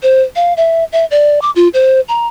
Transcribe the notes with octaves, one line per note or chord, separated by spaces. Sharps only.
C5
F5
E5
E5
D5
D6
F4
C5
A#5